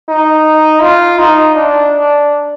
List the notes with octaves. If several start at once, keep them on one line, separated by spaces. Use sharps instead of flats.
D#4
F4
D#4
D4